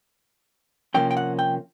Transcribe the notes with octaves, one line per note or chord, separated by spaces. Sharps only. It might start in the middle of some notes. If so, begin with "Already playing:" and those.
C3 F3 A#3 C#4 G5
G5
F#5
G5